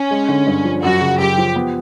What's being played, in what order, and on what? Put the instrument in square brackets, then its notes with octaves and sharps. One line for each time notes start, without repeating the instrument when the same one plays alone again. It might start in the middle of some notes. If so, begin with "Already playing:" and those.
Already playing: [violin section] C#4
[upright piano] G#3
D3
G2
F3
[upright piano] F#2 [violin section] F#4
[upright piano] C#3
[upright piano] F#2 [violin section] G4
[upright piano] F3
B3